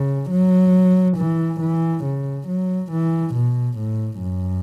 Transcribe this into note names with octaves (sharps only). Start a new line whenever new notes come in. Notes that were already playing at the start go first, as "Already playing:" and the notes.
Already playing: C#3
F#3
E3
E3
C#3
F#3
E3
B2
A2
F#2